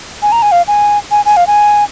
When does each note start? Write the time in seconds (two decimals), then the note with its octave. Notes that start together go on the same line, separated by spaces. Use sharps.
0.22 G#5
0.32 A#5
0.42 G#5
0.52 F5
0.67 G#5
1.11 G#5
1.25 G#5
1.37 F5
1.47 G#5